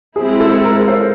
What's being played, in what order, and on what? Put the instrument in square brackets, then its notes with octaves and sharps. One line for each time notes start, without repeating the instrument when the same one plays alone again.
[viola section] G#3 C4 E4 [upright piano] G#4
[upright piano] A4
A#4
C5